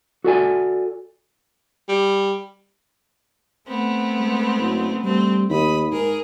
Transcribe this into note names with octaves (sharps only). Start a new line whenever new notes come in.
F#4 A4 D5 G#5
G3
A3 B3 C4
G#3
F#1
G3 A3 C4
D#2 B5 D#6
G#2 G#4 A#4